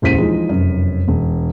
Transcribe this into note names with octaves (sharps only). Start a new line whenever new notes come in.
D#1 C#2 E3 C5 B6 D#7
E3 F3 G#3 D#4
F1 F#2
E1